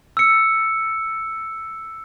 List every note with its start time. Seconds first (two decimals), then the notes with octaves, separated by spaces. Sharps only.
0.17 E6 C#7